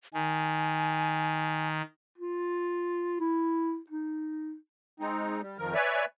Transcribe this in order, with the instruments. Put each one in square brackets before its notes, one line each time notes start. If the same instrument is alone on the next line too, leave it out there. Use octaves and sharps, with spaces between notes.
[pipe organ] D#3 [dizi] G#5
[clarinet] F4
E4
D#4
[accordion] G#3 C4 D#4
G3
F2 D#3 F3 A#4
B4 C#5 D5 E5 G#5